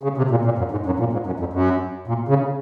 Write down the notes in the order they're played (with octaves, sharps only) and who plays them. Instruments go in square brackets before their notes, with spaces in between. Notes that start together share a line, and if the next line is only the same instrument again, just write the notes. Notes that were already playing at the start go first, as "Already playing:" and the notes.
[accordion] C#3
C3
A#2
A#2
F#2
G#2
F#2
A#2
G#2
F#2
F2
F#2
A#2
C#3